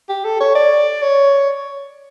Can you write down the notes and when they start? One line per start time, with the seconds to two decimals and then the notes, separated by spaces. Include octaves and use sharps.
0.09 G4
0.24 A4
0.40 C#5
0.55 D5
1.02 C#5